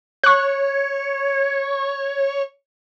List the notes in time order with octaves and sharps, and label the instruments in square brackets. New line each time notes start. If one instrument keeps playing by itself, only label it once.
[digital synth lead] C#5 [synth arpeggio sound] C#6 F#6